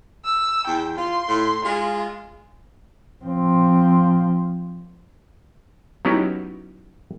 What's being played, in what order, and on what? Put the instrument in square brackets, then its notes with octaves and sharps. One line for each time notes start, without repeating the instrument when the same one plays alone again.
[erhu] E6
[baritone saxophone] E2 [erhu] G5
[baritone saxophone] F4 [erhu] C6
[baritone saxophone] A2
[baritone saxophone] G#3 [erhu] F4
[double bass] F3 C4
[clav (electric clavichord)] F#3 B3 C#4 D#4 E4 G4